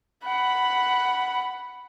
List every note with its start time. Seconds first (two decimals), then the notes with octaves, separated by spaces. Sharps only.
0.24 F#5 B5